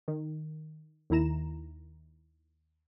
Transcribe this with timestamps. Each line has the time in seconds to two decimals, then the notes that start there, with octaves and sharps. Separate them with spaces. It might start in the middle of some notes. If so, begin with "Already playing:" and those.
0.08 D#3
1.10 D#2 D#3 E4 A#5 E7